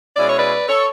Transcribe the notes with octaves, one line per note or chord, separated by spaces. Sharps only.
B2 G#3 C#4 E4 D5
C#5
B4 D5
A4 C#5